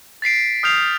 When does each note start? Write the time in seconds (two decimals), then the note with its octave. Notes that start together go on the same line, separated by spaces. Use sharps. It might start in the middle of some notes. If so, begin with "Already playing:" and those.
0.22 A6 B6 C7 D7
0.63 D#6 F6 G6 C7 F7